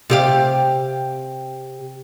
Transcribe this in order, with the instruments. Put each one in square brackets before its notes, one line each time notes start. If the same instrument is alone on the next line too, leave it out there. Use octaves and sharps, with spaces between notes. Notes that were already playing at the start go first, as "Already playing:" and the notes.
[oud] C3 G4 F5